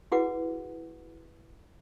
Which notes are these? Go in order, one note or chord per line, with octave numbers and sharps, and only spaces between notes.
E4 F#4 G#4 B4 F#5 D6